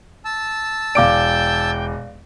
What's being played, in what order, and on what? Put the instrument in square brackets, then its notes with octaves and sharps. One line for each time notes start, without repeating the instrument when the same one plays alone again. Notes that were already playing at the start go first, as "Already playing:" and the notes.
[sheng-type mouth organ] A5 E6
[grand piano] E1 D6 D7 [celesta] D5 F5 [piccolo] G5